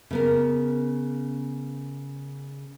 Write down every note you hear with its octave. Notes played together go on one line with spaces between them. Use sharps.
C#3 B3 A#4